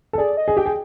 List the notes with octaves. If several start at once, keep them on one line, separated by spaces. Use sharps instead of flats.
A4
G#4 D5
D#5
G#4
G4 G5
G#4